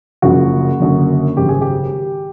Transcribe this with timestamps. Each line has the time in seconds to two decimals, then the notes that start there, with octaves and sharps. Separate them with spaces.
0.22 F#1 F#2 C#3 F3 F#4
0.80 F#1 F#2 D3
1.37 G#1 F#2 C#3 G4
1.49 G#4
1.61 G4